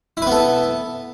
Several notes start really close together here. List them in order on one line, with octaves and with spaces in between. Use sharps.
E4 B4 B3 A4